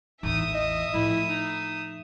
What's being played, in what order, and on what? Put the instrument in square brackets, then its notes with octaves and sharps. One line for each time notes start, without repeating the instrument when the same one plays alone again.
[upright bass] A1 E2 [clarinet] D#4 [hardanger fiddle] E5 D#6
[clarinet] D#5
[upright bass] A2 F3 [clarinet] E4
[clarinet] D#4